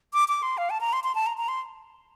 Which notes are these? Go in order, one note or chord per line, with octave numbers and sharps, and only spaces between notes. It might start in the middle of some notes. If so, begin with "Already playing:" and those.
D6
D6
C6
F5
A5
A#5
C6
C6
A5
A#5
A#5
C6